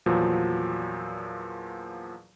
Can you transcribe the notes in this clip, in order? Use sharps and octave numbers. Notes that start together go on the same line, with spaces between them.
E2 A#2 F3 F#3